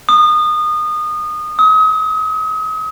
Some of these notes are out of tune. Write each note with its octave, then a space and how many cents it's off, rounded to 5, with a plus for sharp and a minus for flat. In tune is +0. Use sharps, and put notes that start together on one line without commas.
D#6 -25
D#6 +40